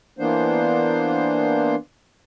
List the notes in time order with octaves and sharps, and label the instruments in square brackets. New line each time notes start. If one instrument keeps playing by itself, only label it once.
[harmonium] E3 A#3 B3 D4 C5